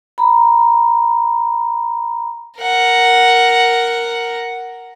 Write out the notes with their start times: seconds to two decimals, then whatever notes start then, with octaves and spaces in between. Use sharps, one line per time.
0.18 A#5 B5
2.59 A#4 F#5